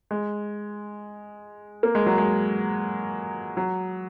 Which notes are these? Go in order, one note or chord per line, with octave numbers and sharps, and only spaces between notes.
G#3
A#3
G#3
F#3
G#3
F#3